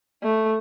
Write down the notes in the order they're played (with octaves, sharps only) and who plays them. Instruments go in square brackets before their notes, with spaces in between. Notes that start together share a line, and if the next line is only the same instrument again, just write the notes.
[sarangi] A3